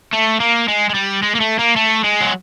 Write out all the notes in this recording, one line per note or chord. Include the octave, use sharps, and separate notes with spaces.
A3
A#3
G#3
G#3
G3
G#3
A#3
A3
A#3
A3
G#3
F#3